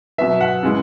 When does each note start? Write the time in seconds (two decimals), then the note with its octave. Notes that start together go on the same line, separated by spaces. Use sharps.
0.18 B2 F#3 B3 E5
0.41 F#5
0.63 C#3 E3 G#3